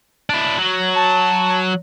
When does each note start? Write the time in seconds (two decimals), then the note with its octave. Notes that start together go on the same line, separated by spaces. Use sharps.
0.30 D4 E4
0.58 F#3
0.95 A5